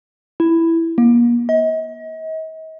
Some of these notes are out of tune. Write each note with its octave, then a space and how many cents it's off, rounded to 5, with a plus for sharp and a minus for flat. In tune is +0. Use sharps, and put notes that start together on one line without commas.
E4 +5
A#3 +40
D#5 +40